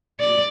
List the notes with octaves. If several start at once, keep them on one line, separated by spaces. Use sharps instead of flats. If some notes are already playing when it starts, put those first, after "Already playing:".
D5